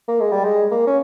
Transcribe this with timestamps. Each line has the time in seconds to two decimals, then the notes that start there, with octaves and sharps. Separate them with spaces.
0.08 A#3
0.20 G#3
0.32 G3
0.44 G#3
0.71 A#3
0.87 C#4